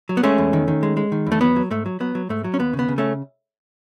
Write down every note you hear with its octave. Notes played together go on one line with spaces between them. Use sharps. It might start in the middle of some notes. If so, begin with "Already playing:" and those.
F#3
B3
G#3 A3 C#4
E2
D#3
D#3
G#3
G#3
D#3
E2
A3
F#3 B3
F#3
G#2 A3
F#3
F#3 B3
F#3
G#2 A3
F#3
C#4
D#2 B3
C#3
B3
C#3
A3 C#4